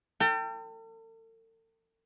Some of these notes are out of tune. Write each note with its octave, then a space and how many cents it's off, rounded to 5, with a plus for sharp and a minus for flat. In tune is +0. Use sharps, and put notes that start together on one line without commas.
A4 +45 G5 +0